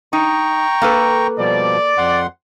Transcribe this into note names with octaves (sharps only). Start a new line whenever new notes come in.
D#4 G5 A#5 C#6
A#3 A4 B4
B2 F3 G3 D5
F2 F#5 C6